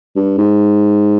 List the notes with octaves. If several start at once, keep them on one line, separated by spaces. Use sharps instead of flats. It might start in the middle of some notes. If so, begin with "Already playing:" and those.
G2
G#2